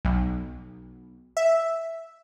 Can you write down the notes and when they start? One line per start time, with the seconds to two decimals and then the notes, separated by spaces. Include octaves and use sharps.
0.05 B1
1.37 E5